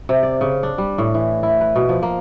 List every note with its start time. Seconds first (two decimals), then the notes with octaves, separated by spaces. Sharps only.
0.09 C3
0.23 D5
0.41 C#3
0.63 D4
0.78 G3
0.98 A2
1.14 E3
1.43 E4
1.61 B4
1.76 B2
1.89 F3
2.03 A#3